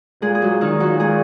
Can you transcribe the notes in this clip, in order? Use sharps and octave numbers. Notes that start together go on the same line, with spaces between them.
A#2 G#3 G#4
G#4
F#3 F#4
D#3 D#4
A#2 F#3 F#4
G#3 G#4